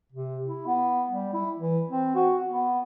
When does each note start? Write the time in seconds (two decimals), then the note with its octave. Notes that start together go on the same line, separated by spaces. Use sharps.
0.12 C3
0.46 E4
0.67 B3
1.11 G3
1.34 E4
1.58 E3
1.89 C4
2.15 F#4
2.51 B3